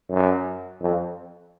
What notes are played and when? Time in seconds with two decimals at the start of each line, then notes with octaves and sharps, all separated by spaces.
0.11 F#2
0.81 F2